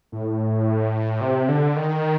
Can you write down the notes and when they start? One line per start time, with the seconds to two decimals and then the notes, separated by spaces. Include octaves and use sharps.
0.12 A2
1.21 C3
1.49 D3
1.76 D#3